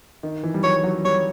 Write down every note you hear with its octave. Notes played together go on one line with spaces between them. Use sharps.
D#3
E3
G3
F#3 C#5
F#3
G3 C#5